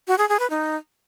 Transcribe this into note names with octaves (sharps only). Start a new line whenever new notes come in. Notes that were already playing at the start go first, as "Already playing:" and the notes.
F#4
G#4
G#4
B4
D#4